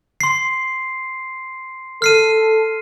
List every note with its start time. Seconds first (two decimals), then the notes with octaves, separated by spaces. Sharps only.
0.21 C6 C7
2.02 A4 F6 C7 D#7